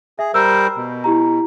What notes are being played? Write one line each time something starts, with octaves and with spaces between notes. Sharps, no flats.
G#4 E5
G3 A#4 C5 E6
B2
E4 G4 A#5